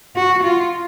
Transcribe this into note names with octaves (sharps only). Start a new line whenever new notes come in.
F#4
F4